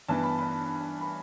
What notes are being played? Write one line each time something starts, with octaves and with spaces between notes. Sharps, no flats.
G2 E3 B3 A5
B5
B5
B5